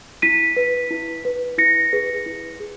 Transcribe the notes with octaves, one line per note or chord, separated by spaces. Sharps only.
E4 B6 D#7
B4
E4
B4
E4 A#6 C#7
G#4 B4
E4
G#4